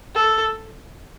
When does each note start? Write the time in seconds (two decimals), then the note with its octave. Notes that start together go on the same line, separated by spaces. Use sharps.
0.15 A4